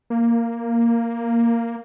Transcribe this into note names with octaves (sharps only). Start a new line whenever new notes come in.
A#3